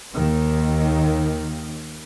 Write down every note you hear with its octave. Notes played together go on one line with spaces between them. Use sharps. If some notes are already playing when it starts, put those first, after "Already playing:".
D#2 D#3